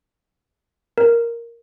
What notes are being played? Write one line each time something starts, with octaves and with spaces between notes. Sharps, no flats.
A#4